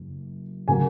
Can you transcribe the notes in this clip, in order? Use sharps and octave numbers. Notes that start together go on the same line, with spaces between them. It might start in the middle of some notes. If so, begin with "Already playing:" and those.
Already playing: F#1 F#2
C#3 F#3 A#3 G#5